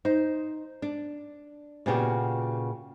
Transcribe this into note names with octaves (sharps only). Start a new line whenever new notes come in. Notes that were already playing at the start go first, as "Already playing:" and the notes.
D#4 C5
D4
A#2 C#3 B3 F#4 G4